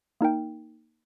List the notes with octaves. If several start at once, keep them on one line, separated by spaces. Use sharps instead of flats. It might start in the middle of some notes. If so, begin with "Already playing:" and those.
A#3 D#4 A#4 G5